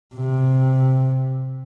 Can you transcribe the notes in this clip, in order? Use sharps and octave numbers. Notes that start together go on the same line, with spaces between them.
C3